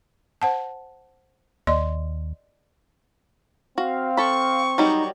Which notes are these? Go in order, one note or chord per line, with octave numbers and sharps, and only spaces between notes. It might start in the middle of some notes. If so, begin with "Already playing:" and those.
C5 F#5 A5
D#2 D5 D#5 C6
C4 F#4 F5
A4 B5 C#6
D#3 F#3 G3 D#4